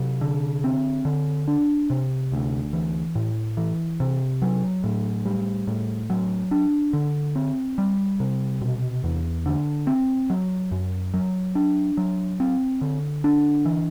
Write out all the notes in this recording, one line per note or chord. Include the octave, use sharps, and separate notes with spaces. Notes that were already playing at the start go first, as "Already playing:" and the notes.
Already playing: C3 F#3
D3
C4
D3
D4
C3
D2
E3
A2
E3
C3
F#3
A2
G3
A2
F#3
D4
D3
C4
G3
C3
B2
E2
D3
C4
F#3
F#2
F#3
D4
F#3
C4
D3
D4
E3